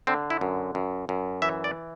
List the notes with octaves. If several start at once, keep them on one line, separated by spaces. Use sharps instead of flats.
D3 C4
E4
F#2
F#2
F#2
E3 E5
D5